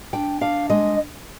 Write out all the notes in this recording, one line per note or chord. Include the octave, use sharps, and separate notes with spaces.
D4 G5
D4 F5
G#3 D#5